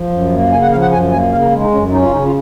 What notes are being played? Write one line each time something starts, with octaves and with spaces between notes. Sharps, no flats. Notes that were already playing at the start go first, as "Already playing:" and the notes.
Already playing: F3
F#2
A#3
C#3 G#5
F#5
F3 F5
F#5
F#2 G#5
A#3 G#5
C#3 F5
A#4
G#3
D#4
F#2 C#4
C#4 D#4
F4
C#3 D#4
F4